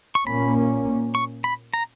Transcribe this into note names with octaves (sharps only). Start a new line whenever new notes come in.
C#6
A#2 A#3 C#4 B5
C#6
B5
A#5